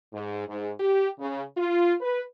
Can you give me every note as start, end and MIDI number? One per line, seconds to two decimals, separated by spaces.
0.13 0.46 44
0.48 0.71 44
0.79 1.10 67
1.19 1.44 49
1.57 1.95 65
2.01 2.22 71